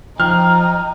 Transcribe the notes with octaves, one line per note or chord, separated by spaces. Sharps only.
F3 D#4 G5 F6